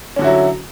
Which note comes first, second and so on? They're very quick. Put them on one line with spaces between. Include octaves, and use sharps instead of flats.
C#4 D3 F#4 E4 F#3